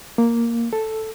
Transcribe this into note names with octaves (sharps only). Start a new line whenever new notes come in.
A#3
A4